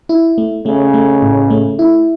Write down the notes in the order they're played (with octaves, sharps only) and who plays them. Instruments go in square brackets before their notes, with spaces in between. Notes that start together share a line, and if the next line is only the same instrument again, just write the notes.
[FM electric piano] E4
A3
[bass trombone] C#3 [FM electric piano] A3
[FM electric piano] A3
A2
A3
E4